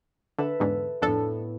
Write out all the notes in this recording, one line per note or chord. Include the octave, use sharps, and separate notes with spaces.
D3 A4 B4 E5
E2 G#2 D3
F2 A2 B3 D4 A4